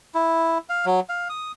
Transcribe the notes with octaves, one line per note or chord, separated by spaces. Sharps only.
E4
F5
F#3
F5
D#6